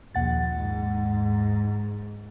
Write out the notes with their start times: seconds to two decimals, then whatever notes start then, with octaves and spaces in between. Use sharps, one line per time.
0.15 A#1 D#2 F#5 A6
0.56 G#2